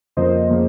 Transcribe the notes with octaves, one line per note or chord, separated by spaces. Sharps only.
F2 C#3 F3 A#3 C5 D#5
C#3 F3 A#3